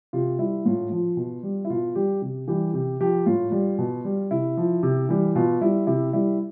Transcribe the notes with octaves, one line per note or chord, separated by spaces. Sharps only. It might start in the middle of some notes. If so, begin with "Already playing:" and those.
C3 F4
G3 E4
A2 F4
F3
B2
G3
E4
B2 F4
G3 G4
C3
E3 G3 G4
C3 G4
F3 G4
A2 F4
G3
B2
G3
C3 E4
F3
C3
E3 G3
B2 F4
G3 E4
C3 E4
G3 E4